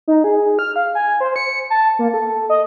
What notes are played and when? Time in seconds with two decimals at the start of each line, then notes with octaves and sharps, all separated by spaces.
0.08 D#4
0.24 G#4
0.59 F6
0.76 F5
0.95 G#5
1.20 C5
1.36 C#7
1.70 A5
1.99 A#3
2.14 A4
2.49 D#5